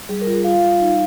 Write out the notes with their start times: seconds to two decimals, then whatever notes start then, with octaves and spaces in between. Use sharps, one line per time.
0.09 G3 G#4
0.21 A#4
0.27 F4
0.33 G#4
0.44 F4 F5
0.63 G3
0.80 D#4